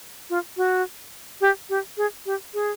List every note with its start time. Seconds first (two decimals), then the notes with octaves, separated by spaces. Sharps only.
0.30 F4
0.57 F#4
1.41 G4
1.70 G4
1.97 G#4
2.26 G4
2.54 G#4